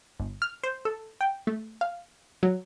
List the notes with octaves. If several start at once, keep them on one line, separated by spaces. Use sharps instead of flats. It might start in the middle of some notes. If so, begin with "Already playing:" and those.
G1
F6
C5
A4
G5
A3
F5
F#3